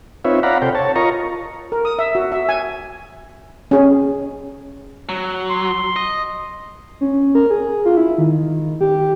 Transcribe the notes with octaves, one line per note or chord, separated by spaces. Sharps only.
C4 D#4 F4 B4 C#5 E5
D5 F5 F#5 A#5 B5
C3 A4 C5 G5
C#5 A5
F4 A#4 D#5 A#5 C#6
A#4
D#6
E5
F#4
E5
G#5
C#4 G#4
F#3
C6
D#5
C#4
A#4
G#4
F4
E4
D#3
G4